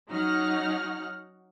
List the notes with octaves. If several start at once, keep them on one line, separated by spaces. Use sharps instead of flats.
F#3 C#4 D#4 F#5 F6